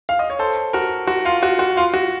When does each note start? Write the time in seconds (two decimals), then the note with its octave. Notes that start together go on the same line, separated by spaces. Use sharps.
0.09 F5
0.19 D#5
0.30 C#5
0.39 A4 C5
0.73 F#4 A#4
1.07 F#4
1.25 F4
1.43 F#4
1.59 F#4
1.77 F4
1.94 F#4